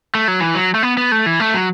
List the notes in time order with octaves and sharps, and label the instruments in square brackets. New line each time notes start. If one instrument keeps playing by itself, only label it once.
[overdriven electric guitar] A3
F#3
E3
F#3
A3
B3
B3
A3
E3
A3
F#3